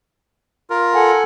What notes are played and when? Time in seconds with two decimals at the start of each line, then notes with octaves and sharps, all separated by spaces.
0.70 F4 A#4
0.95 A4 F#5 G#5